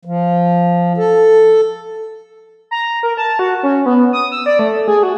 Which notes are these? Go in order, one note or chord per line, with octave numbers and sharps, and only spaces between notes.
F3
A4
A#5
A#4
A5
F#4
C#4
B3
D#6
E6
D5
A3
G#4
F#4